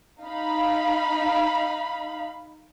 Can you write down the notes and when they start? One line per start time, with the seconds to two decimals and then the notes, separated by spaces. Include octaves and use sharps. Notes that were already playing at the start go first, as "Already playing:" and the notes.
0.24 D#4 F5 B5